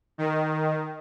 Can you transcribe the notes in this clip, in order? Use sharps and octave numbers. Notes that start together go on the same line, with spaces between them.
D#3